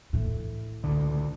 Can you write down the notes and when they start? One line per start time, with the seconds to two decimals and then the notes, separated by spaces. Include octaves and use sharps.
0.13 A2 E3
0.84 C#2 D3